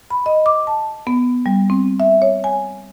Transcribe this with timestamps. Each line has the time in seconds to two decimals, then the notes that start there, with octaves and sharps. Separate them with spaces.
0.10 B5
0.26 D#5
0.46 D6
0.67 A5
1.07 B3
1.46 G3
1.70 C4
2.00 E5
2.22 C#5
2.44 G#5